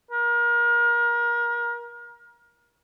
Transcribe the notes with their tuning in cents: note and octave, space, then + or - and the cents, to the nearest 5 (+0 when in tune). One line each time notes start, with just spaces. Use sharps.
A#4 +30